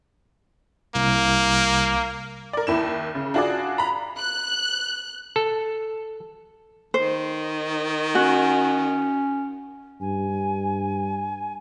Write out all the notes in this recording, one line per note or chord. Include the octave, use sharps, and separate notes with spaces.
C2 A#3
A#4 D5
D#2 E4 E7
C#3
D4 F4 F#4 G#4 D5
A#5 B5
F#6
A4
D#3 C5
C#4 F#4
G2 G#5